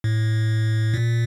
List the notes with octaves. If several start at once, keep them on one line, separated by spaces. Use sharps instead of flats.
A2
A#2